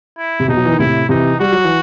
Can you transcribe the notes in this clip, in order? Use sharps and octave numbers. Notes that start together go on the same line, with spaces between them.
E4
C3
B2 D#4
F#3
E3
D#3
A2 C3 E4
C3 E3 D#4
G3 F#4
F#3
E3